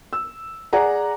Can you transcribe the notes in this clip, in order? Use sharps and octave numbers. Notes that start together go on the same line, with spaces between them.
E6
G#4 D5 F#5 G#5 A#5